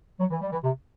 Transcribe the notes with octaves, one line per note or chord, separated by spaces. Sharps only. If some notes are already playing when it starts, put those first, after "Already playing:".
F#3
E3
G3
E3
C3